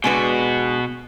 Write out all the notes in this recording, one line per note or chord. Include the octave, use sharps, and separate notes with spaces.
B2 G#3 D4 F#4 B4